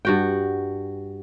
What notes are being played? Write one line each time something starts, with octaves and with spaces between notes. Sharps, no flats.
G2 F#4 G5